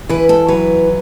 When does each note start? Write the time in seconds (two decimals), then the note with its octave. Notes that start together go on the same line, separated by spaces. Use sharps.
0.09 E3 B4
0.29 A4
0.48 F#3 B4